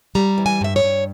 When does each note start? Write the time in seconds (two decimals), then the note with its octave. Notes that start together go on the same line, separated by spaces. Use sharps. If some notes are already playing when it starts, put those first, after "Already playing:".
0.15 G3 A#5
0.38 E3
0.46 G#5
0.61 G2 E5
0.76 C#5
0.83 G2